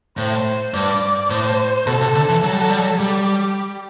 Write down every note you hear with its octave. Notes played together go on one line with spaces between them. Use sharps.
A2 C5
G2 D5
A2 C5
B2 A4
C3
D3
E3
F#3 A4
G3
F#3
G3
F#3
G3 G4